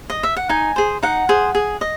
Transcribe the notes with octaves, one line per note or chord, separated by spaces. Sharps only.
D#5
E5
F#5
D#4 G#5
G#4 C5
D#4 F#5
G#4 C5
G#4
D#5